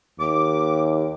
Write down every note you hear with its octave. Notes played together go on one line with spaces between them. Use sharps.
D#2 D6